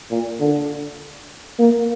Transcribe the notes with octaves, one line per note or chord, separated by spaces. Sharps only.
A#2
D3
A#3